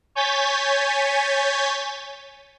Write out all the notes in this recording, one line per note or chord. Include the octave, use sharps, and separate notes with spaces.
C#5 G#5 G6 A6 B6